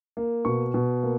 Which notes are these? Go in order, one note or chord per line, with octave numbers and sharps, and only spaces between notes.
A#3
B2 C#6
B2
A#3